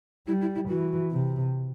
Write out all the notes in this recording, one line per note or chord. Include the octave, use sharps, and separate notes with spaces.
G3 E4
E4
E4
E3 F#4
C3